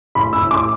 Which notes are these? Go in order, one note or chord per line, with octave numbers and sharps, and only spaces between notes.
A2 B5
E6
A2
D6